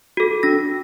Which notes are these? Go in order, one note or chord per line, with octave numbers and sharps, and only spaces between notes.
F#4 A4
D4 A#6